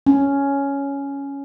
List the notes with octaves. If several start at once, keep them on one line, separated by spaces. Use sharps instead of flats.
C#4